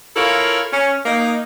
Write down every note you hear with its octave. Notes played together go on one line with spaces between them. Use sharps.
E4 F4 A4 A#4 C#5 F5
C#4
A#3 D#4